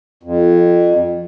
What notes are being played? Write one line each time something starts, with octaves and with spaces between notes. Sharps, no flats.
F2